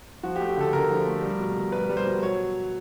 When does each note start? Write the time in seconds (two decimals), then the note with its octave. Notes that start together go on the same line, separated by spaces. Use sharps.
0.23 F3 F#4
0.36 G4
0.40 A3
0.49 G4
0.57 D3 A4
0.73 D3 A#4
0.90 F3
1.07 A3
1.23 G3
1.40 B2
1.57 B2
1.72 G3 B4
1.89 G3
1.97 C5
2.06 B2
2.22 F#3 C#5